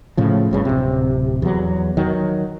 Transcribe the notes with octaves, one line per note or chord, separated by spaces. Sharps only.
A2 C#3 F3
G#1 G2 C#3
D1 C3
E2 F#3
D#3 F#3